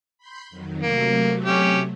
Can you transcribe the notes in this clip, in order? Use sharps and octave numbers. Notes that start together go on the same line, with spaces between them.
B5 C6 G6
F2 D#3 F#3
C3 F#3 A3 A#3
C#4 G4